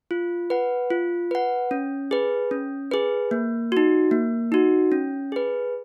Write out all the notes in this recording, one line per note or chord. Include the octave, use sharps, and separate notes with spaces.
F4
B4 F#5
F4
B4 F#5
C#4
G#4 B4
C#4
G#4 B4
A#3
D#4 F#4
A#3
D#4 F#4
C#4
G#4 B4